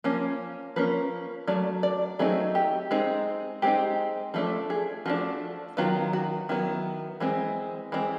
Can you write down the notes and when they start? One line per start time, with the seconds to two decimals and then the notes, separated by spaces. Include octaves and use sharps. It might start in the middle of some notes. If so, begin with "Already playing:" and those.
0.04 F3 A#3 C#4
0.76 F3 A#3 C#4 B4
1.47 F#3 A3 D5
1.83 D5
2.19 F#3 A3 C4 D#4 G#4
2.55 G4
2.91 G#3 C4 D#4
3.62 G#3 C4 D#4 G4
4.34 F3 A3 D4 A4
4.70 G#4
5.06 F3 A3 D4 F#4
5.77 D#3 F#3 B3 F4
6.13 F#4
6.49 D#3 F#3 B3 E4
7.20 E3 G#3 C4
7.92 E3 G#3 C4